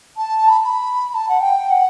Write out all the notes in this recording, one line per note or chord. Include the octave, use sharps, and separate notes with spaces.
A5
B5
B5
B5
A5
F#5
G5
F#5